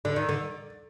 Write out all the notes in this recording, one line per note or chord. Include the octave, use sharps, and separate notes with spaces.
D3 D5
D#3
D3